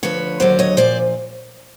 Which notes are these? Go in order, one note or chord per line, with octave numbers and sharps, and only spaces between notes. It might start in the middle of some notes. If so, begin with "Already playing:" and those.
D2 D3 F3 B4 C#5
D#2 D3 F#3 C5 D5
C#5 D#5
A#2 F3 C5 D5